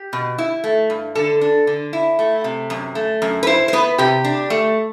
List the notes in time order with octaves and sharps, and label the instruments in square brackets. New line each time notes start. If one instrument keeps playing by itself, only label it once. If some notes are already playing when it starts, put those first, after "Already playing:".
Already playing: [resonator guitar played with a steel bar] G4
B2
E4
A3
G2
D3 A4
D4
D3
E4
A3
C3
F#2
A3
F#2
B4
E4 C5
C5
B3 B4
C3 G4
D4
A3